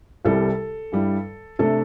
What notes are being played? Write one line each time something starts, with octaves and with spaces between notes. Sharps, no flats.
C2 C3 G3 E4 A4
G2 G3 E4
C3 A3 D4 A4